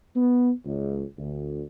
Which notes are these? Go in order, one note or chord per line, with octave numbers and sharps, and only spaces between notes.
B3
C#2
D2